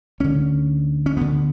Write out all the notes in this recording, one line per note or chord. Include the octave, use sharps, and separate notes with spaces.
D2 D3 C#4
C#4
D2 D3 B3